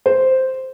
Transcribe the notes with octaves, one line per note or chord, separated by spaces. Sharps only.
C5